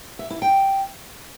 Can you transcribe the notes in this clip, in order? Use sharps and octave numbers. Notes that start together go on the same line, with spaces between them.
E5
E4
G5